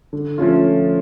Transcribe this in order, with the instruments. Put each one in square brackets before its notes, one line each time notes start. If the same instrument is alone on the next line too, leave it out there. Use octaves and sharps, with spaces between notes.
[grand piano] D3
F3 A3 C#4 F4